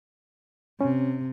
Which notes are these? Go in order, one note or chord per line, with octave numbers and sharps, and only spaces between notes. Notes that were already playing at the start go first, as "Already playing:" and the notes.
C3 C#4